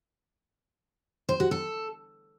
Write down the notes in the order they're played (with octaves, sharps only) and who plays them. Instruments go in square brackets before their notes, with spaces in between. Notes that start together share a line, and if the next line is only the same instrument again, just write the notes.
[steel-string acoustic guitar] C5
F#4
A4